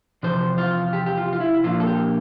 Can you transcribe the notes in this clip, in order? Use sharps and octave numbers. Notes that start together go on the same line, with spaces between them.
E2 C3 F3 C5
F4
G4
G4
F4
F4
E4
A#2 F3 A#3 D4 F4
A4
G4